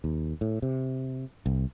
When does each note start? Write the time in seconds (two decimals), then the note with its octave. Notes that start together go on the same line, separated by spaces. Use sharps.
0.04 D#2
0.41 A2
0.62 C3
1.46 C2